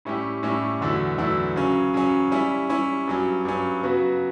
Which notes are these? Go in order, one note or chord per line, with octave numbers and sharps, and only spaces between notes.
A2 G3 C#4 E4 G4
A2 G3 C#4 E4 G4
E2 D3 F#3 A3 E4
E2 D3 F#3 A3 E4
C#3 F#3 C#4
C#3 F#3 C#4
G3 C#4 E4
G3 C#4 E4
G2 F#3 C#4
G2 F#3 C#4
C#3 F#3 B3 F#4